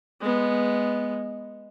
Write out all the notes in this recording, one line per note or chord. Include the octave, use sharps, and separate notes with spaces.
G#3 B3